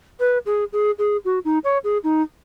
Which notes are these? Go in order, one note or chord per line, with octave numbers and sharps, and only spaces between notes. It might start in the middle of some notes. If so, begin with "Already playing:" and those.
B4
G#4
G#4
G#4
F#4
D#4
C#5
G#4
D#4